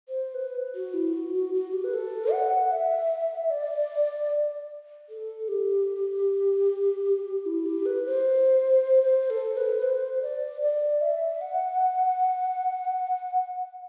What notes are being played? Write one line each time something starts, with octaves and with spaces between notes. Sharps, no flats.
C5
B4
F#4
E4
F#4
F#4
F#4
G4
B4
A4
F#5
E5
D5
A4
G4
E4
G4
B4
C5
C5
A4
B4
C5
D5
D5
E5
F#5